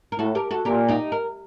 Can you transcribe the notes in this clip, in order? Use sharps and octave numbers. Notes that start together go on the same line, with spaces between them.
A#4
A2 F#4 A4
G4 A#4
F#4 A4
A#2 G4 A#4
D#4 G4
A#4